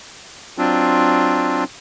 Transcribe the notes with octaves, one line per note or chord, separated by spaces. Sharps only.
F#3 C4 D4 F4